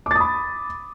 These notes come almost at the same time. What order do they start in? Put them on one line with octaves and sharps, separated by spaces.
D6 A6 D#6 B5